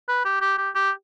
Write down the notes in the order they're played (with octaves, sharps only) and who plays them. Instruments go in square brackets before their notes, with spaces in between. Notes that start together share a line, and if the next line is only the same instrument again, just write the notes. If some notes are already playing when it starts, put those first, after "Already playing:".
[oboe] B4
G4
G4
G4
G4